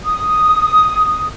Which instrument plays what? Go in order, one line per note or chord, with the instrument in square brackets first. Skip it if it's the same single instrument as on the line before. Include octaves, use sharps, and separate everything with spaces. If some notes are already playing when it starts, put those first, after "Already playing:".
[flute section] D#6